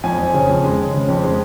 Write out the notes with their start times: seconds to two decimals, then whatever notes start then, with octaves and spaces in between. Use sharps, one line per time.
0.03 F2 G#5
0.18 F2
0.34 C#3
0.49 F2
0.64 G#3
0.78 C#3
0.94 C#3
1.08 F2
1.24 G#3